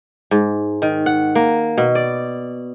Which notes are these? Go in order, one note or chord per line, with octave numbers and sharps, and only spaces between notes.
G#2
D#3
F#5
A#3
B2
D5